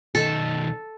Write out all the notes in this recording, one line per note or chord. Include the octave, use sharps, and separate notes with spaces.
B1 D#3 A4